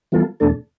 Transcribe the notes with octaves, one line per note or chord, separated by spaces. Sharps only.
E3 G3 B3 F4 A4
E2 B2 A3 D4 A4